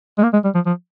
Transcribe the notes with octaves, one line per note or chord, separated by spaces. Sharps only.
G#3
A#3
G#3
G3
F3
F3